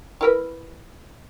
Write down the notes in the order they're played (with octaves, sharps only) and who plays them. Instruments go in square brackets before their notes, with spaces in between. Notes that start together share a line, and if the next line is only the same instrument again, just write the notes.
[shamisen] E4 A#4 B4